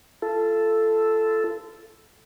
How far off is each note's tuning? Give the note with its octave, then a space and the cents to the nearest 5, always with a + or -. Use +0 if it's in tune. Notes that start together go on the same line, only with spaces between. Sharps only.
F4 -35 A4 +0